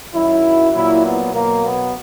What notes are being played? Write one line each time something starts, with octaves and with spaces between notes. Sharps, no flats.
F#2 D#3 F#3 E4
A#2 F#3 E4
B3
B2 F#3 A#3
B3